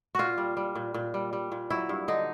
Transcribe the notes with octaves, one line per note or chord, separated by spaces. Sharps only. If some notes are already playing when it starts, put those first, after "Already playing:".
A#2 F4 F#4
G3
G3
A#2
A#2
G3
G3
A#2
F#3 E4
G2
D3 D#4